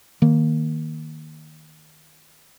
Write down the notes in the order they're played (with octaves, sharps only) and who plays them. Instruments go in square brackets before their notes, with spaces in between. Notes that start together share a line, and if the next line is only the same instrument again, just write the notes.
[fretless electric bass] D#3 A#3